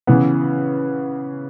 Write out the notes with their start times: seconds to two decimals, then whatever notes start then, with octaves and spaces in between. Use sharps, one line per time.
0.07 C#3 E3 B3